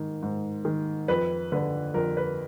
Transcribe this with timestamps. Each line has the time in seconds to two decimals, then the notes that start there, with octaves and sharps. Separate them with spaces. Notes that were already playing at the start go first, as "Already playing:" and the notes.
Already playing: G#2 D#3
0.22 G#2
0.65 D#3
1.08 F2 B4
1.52 D3 B4
1.94 F2 A#4
2.17 B4